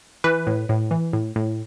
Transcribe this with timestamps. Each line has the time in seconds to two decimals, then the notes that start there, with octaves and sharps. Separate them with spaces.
0.24 E3 B4
0.47 A2
0.69 A2
0.91 E3
1.13 A2
1.36 A2